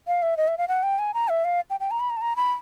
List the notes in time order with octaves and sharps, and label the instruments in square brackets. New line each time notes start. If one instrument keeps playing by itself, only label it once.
[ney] F5
E5
D#5
E5
F5
F#5
G5
G#5
A#5
E5
F5
G5
G5
A#5
B5
A#5
A5
A#5
B5